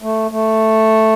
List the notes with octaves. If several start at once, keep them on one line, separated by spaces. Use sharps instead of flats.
A3
A3